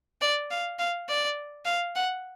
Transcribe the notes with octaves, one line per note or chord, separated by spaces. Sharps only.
D5
F5
F5
D5
F5
F#5